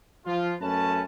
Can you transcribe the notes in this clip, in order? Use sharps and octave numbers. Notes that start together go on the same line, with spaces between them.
F3 F4
F#2 A3 C#4 B4 A5